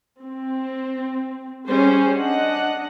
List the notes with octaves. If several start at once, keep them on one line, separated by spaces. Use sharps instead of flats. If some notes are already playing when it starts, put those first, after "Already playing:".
C4
G3 C#4 G#4 C5
D4 D#5 F#5